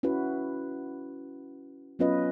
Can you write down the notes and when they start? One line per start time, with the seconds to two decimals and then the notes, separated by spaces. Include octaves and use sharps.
0.03 C#4 E4 F#4 B4
1.99 F#3 B3 C#4 F4 B4 D#5